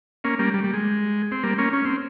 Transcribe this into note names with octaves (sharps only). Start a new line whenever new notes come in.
A#3 C#4
G3 A#3
G3
G3
G#3
C4
G3 A#3
A#3 C#4
C#4
C4